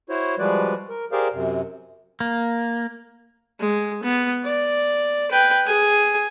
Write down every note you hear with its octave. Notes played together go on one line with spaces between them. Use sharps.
E4 F#4 C5 C#5
F3 G3 G#3 F#4 B4 D5
A#4
G4 G#4 A#4 C5 D5 F5
F#2 C3
A#3
G#3
B3
D5
B4 G5
G#4 G#5